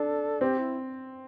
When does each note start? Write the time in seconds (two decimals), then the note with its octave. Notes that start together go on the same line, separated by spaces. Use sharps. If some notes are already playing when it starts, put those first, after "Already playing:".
Already playing: D4 A4
0.41 C4 G4
0.59 E4